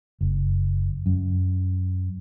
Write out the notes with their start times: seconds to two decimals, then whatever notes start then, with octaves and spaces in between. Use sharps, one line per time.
0.21 F#1
1.06 F#2